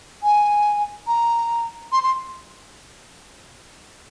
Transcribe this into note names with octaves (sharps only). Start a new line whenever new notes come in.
G#5
A#5
C6
C6